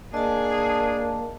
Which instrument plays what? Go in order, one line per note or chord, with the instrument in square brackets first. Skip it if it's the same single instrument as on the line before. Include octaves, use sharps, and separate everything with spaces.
[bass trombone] A#3 [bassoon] D4 [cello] G#4 [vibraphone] D#5 A5